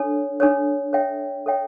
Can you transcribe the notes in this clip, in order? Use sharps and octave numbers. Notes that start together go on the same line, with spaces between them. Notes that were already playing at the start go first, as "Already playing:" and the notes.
Already playing: D4 A4 C#5
D4 A4 C#5
A4 C#5 E5 G5
A4 C#5 E5 G5